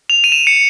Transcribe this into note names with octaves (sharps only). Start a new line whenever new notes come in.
F7
D#7
E7
C#7